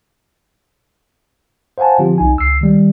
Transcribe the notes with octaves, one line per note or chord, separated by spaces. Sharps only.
C5 F5 F#5 G#5 A5
D3 F3 C4 F4 G4
B1 D#4 G#5
C#2 E6 C7
D#3 G3